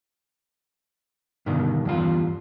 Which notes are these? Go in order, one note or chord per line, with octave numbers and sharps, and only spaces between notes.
G2 B2 D3 D#3
E2 G2 F4